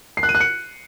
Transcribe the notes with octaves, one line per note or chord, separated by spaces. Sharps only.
C7
F#6
D#7
F#6
C#7